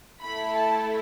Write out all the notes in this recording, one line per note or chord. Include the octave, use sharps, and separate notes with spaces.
A3 E4 A4 B5
A5